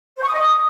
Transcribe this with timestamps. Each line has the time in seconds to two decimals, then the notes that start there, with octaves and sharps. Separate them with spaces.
0.16 C5
0.22 C#6
0.27 D#6
0.33 D#5
0.38 D#6